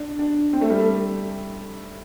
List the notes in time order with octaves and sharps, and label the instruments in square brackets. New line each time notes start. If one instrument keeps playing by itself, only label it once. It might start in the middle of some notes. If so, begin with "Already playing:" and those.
Already playing: [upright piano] D4
D4
C4
A3
G3
A3